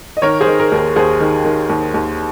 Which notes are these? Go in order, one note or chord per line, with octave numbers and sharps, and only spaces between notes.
D#5
D#3 A#4 C#5
G#4 C5
D#3
A#4
D#2
A#4
D#2 G#4 C5
D#3
D#3
D#2
D#2